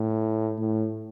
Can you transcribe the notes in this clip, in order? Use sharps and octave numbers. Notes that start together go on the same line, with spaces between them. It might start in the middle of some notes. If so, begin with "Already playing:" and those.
Already playing: A2
A2